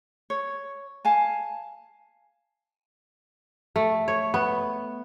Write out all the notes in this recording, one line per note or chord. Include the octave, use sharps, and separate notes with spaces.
C#5
F5 G#5 A5
A3
C#5
B3